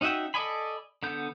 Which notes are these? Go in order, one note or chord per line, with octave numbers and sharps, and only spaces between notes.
C#4 D#4 F#4 E5 G5
A4 D5 D#5 G#5 B5
D3 B3 G6